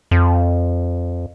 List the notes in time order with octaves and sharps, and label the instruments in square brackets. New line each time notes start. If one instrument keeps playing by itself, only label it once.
[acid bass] F2